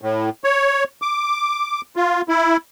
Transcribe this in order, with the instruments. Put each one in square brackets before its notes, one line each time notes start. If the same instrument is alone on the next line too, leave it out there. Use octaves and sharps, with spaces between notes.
[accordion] A2
C#5
D6
F4
E4